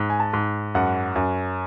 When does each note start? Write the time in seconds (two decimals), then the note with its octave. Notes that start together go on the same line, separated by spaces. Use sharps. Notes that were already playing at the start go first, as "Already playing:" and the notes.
Already playing: G#2
0.10 G#5
0.20 A5
0.33 G#2
0.75 F#2 F#5
1.16 F#2